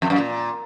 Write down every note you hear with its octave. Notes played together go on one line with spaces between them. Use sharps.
F2
F#2
A#2